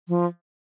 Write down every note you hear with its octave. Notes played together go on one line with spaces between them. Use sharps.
F3